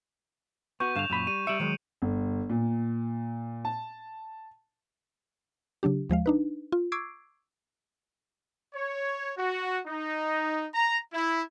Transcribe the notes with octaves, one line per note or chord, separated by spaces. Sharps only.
B3 F#4 C#6 G6 D#7
G2 D3 F5 E7 F7
F#2 A#2 B5
G3 D#7
G3 E5 C#7 D7 F#7
D#3 F#3 G#3
G1
A#2
A5
C#3 F#3 D4 G4
D#2 F3 G#3 F5
D4 D#4 B4
F4
C#6 D6 E6 G#6 C7 D7
C#5
F#4
D#4
A#5
E4